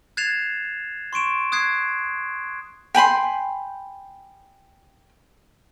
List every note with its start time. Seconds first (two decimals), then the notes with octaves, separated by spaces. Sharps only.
0.17 F#6 G#6 A6 C7 E7 F7
1.13 C6 C#6 D7 E7
1.52 D#6 F#6 G#6 C7
2.95 G5 G#5 B5 C6